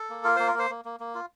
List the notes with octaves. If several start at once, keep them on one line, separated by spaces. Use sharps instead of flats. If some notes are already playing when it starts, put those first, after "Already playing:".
Already playing: A4
A#3
F4 A#4
A#3 C5
A#4
A#3 C5
A#3
A#3
A#3
F4